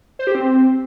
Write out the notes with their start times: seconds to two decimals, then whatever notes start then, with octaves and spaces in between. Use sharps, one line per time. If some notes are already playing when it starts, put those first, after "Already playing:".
0.19 C5
0.27 G4
0.35 C4